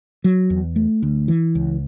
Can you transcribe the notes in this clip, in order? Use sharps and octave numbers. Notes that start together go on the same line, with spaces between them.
F#3
E2
A3
D2
E3
C#2